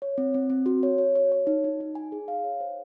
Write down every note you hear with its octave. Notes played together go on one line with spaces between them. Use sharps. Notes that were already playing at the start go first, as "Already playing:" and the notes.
C#5
C4
C4
C4
F#4
C#5
C#5
C#5
C#5
D#4
D#4
D#4
G#5
G#4
F5
C#5
C5